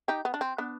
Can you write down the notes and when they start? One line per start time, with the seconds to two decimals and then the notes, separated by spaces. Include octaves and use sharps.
0.08 D#4 G4
0.25 B3
0.34 D4
0.41 C4
0.58 B3 D4